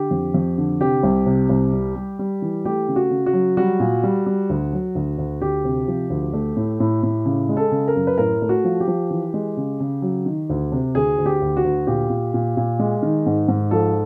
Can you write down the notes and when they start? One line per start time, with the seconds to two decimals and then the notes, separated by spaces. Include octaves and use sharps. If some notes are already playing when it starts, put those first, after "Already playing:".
Already playing: D3 G4
0.11 F2
0.34 F2
0.58 D3
0.80 C3 G4
1.03 C2
1.26 C3
1.49 C2
1.73 G3
1.96 G3
2.19 G3
2.42 E3
2.65 A3 G4
2.88 C#3
2.96 F#4
3.11 C#3
3.26 F#4
3.33 F#3
3.57 G3 F#4
3.80 A#2
4.03 G3
4.26 G3
4.50 D2
4.73 F#3
4.95 D2
5.18 D2
5.41 D2 G4
5.64 C3
5.88 F3
6.10 D2
6.33 A3
6.56 A2
6.80 A2
7.03 A2
7.25 C#3
7.49 G#3
7.57 A4
7.72 C#3
7.88 A#4
7.96 F#2
8.07 B4
8.18 A2 A#4
8.42 A3
8.49 F#4
8.64 F3
8.80 G4
8.88 F3
9.11 E3
9.34 G#3
9.57 C#3
9.80 C#3
10.02 F#3
10.26 D#3
10.49 D2
10.72 C3
10.95 D2 G#4
11.18 D2
11.26 G4
11.41 D2
11.57 F#4
11.64 D2
11.87 A#2 G4
12.10 A#2
12.34 A#2
12.57 A#2
12.79 G#3
13.02 D#3
13.26 G#2
13.48 G#2
13.71 F3 A4